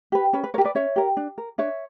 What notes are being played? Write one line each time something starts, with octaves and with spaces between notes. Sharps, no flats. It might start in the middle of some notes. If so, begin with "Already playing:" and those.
G4 B4
C#4 B4
B4
G4 A#4 C#5
B4 D5
C#4 C#5 E5
G4 A#4
D4
A#4
D4 C#5 E5